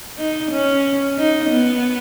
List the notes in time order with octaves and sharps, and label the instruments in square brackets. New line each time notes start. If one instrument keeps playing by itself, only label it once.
[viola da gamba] D#4
C#4
D#4
B3